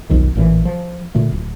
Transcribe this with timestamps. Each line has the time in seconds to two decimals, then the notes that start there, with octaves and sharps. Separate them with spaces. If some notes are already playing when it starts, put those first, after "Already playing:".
0.09 F1 B1 F2 D#3
0.35 A1 A#2 D3 E3
0.65 F3
1.15 A#2 D3 A3
1.32 D1